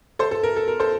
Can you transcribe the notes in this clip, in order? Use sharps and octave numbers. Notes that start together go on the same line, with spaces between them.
A4 C5
A4
A#4
A4
A#4
A4 C5